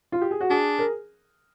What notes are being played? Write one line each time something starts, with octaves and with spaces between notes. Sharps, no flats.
F4
G4
G#4
F#4
D4 G#4
A#4